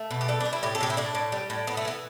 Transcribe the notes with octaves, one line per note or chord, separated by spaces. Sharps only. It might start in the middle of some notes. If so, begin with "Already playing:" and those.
Already playing: A3
B2
G4
G3 A4
G3 D4
E4
A2 G4
A4
A2 G4
E4
A2 D4
A2
G3
A2
A2 B3
A3
E3 B3